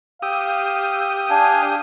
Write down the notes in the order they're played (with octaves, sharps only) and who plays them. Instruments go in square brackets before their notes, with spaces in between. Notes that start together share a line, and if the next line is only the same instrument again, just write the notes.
[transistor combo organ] G4 D#6 [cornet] F5 [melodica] E6
[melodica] D4 G#5 [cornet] F5